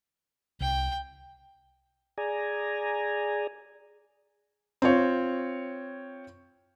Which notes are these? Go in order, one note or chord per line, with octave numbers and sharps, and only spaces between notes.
C2 G5
G#4 D5 G#5 A#5
C4 F4 C#5